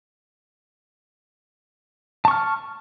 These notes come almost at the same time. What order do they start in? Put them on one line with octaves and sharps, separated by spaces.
A5 C#6 F6